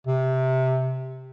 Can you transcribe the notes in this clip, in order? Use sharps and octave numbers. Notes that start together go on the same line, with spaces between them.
C3